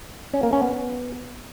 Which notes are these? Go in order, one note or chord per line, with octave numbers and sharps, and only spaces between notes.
C#4
A#3
C#4
B3